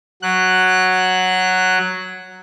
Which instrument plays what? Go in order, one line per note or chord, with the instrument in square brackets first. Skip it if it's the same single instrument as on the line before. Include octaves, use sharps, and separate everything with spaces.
[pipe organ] F#3 F#6